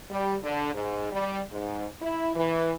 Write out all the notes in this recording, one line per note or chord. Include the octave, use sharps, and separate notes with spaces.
G3
D3
G#2
G3
G#2
E4
E3